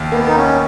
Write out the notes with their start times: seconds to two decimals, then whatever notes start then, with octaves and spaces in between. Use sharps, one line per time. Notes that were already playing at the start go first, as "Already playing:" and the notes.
Already playing: D#2 D#3
0.12 A#3 B3
0.28 D#4
0.36 C#4